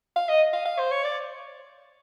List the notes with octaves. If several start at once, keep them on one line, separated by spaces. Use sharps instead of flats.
F5
D#5
F5
F5
C5
C#5
D5